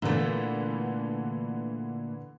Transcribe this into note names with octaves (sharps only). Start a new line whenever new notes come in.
A#2 D3 E3 A3 B3